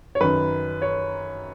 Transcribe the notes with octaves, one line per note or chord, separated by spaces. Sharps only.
C#5
F#2 D#3 B4
C#5